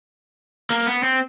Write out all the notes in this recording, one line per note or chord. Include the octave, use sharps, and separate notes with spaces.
A#3
B3
C4